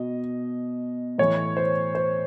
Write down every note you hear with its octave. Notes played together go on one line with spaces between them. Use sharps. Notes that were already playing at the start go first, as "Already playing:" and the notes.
Already playing: B2 D#5
A2 E3 C#5
C5
C5